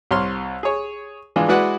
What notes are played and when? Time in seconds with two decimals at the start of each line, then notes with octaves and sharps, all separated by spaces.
0.11 C2 C#5 C6 F6
0.63 G#4 C#5
1.36 E3 G#3 D4 F4
1.48 G#3 E4 F#4 B4 D5 F#5